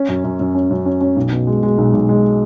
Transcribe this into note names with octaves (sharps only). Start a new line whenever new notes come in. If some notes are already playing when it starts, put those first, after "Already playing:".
Already playing: C#4
F#2
F#2
F#2
C#4
F#2
C#4
C#4
B1
B2
G#3
G#3
B1
B1
G#3